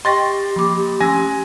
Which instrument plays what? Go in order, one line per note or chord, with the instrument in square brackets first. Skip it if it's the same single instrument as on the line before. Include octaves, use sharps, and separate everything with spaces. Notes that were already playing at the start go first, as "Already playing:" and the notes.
[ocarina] G4 [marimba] D#5 G5 C#6 [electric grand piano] C6 A6 A#6
[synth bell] F3 A#3 [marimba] B5 D6
[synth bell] F3 C#4 E6 [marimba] A3 C6 [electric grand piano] G#5 A#6